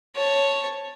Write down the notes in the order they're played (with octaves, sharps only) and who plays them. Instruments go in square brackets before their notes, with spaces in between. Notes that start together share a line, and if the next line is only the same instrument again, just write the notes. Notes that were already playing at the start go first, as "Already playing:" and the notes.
[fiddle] C#5 A5